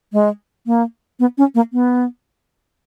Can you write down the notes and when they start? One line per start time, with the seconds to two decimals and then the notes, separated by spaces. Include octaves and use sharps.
0.13 G#3
0.66 A#3
1.20 B3
1.38 C#4
1.55 A#3
1.73 B3